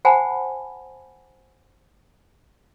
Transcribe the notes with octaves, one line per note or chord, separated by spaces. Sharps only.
C5 F#5 G#5 A5 B5